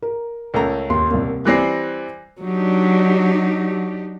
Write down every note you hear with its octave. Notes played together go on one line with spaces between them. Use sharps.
A#4
C#2 A3 A#4 A#5
D#2 C6
C2 A#3
E3 G3 C4 F#6 A#6 C7
F#3 D4 D#4 G4